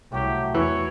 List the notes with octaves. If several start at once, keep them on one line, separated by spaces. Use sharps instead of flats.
C2 A2 F#3 G4
E2 E3 C#5